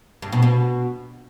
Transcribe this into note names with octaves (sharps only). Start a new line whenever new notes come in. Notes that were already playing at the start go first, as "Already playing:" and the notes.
G2
B2
B2